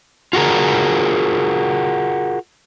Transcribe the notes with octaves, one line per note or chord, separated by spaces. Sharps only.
F4 F#4 G#4 A#4